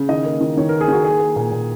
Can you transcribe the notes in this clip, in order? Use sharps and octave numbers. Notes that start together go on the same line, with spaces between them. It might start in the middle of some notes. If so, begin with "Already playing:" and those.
Already playing: C#3
D#3 D#5
A#3
D#3
D#3 C#5
A#3 A#4
G#4
D#3 F#4
A#3 G#4
A#3
A#2
A#2